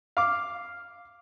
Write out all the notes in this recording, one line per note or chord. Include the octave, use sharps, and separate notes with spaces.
F5 D6